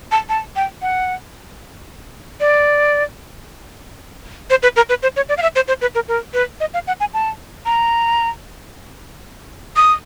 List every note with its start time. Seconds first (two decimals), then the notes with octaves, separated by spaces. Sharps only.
0.12 A5
0.29 A5
0.56 G5
0.82 F#5
2.40 D5
4.50 C5
4.63 B4
4.76 A#4
4.89 B4
5.03 C5
5.16 C#5
5.29 D5
5.37 F5
5.42 E5
5.56 C5
5.68 C5
5.81 B4
5.95 A#4
6.08 A#4
6.34 B4
6.60 D#5
6.74 F5
6.87 F#5
7.00 G#5
7.14 A5
7.66 A#5
9.76 D#6